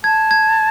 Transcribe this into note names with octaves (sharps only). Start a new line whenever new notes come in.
A5 G#6
G#6